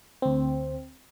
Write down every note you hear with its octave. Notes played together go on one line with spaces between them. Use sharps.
D2 C4